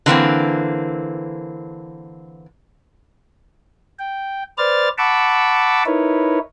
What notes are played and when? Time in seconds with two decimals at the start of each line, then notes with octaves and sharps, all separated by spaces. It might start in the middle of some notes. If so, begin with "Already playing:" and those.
0.06 D3 E3 A#3 C4
3.99 G5
4.58 B4 C5 D5 F6 A6
4.98 F#5 A5 B5 C#6 D6 E6
5.86 D#4 E4 A#4 B4 C#5